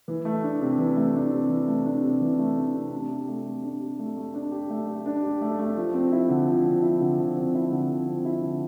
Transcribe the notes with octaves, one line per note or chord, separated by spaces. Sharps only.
E3
A3
D4
C3
E3
A3
D4
C3
E3
A3
D4
C3
E3
A3
D4
C3
D4
G4
A3
A3
D4
G4
A3
A3
D4
G4
A3
A3
D4
G4
A3
A3
F3
C4
E4
D3
F3
C4
E4
D3
F3
C4
E4
D3
F3
C4
E4
D3